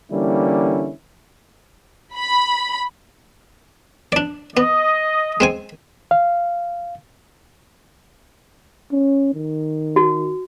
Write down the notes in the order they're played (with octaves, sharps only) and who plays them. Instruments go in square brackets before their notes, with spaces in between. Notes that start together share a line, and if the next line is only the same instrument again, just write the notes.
[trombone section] D3 E3 G3 A#3 C#4 E4
[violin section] B5
[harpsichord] D4 D5
[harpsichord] B3 [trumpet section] D#5
[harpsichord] G#3 C4 G#5
[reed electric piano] F5
[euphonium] C#4
D#3
[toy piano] F#4